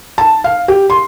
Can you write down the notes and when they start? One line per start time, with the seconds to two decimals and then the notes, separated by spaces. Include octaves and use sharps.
0.18 A5
0.44 F5
0.68 G4
0.90 C6